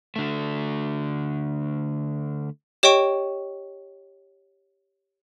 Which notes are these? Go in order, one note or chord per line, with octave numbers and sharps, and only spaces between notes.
D3 A3
G4 C#5 D#5 G5 C#6 D7